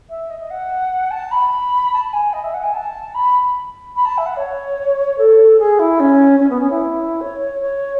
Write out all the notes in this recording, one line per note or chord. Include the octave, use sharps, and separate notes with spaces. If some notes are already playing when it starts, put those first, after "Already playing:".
E5
D#5
F#5
A5
B5
A5
G#5
D#5
E5
F#5
G#5
A5
B5
B5
A5
E5
F#5
C#5
A4
G#4
E4
C#4
C#4
B3
C#4
E4
C#5
C#5